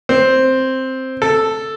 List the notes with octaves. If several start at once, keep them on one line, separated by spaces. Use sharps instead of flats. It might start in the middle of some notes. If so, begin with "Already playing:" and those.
C4
A4